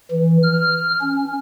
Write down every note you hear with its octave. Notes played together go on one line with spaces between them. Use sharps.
E3
F6
C#4